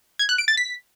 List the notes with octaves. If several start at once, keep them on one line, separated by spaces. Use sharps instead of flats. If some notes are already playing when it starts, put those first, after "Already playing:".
G#6
F#6
D7
A6
B6